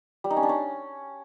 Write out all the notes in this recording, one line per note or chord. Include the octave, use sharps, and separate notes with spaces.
G3
D#4
C#4
D4
C#4